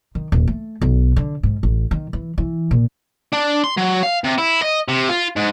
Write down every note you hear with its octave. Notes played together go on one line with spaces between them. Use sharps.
D#3
D#1
A3
B1
D3
G#2
A1
D#3
E3
E3
A#2
D4
C6
F#3
F5
C3
E4
D#5
C3
F4
G#2